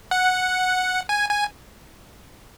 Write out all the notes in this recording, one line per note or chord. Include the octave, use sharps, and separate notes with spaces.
F#5
G#5
G#5